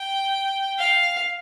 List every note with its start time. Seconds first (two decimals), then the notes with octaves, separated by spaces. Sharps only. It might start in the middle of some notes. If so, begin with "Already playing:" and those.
Already playing: G5
0.79 F5